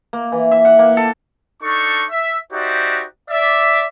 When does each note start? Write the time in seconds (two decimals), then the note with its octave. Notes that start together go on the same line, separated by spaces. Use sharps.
0.13 A#3
0.32 E3
0.51 E5
0.65 F#5
0.79 A#3
0.97 A4
1.63 D4 D#4 A4 C#6
2.10 E5
2.53 D#4 F#4 G4 C5 D5 E5
3.30 D5 E5